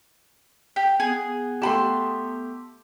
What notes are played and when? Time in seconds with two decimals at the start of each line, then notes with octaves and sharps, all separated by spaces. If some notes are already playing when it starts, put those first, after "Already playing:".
0.76 G4
1.00 B3 G#4
1.62 A3 G4 A5 B5 C6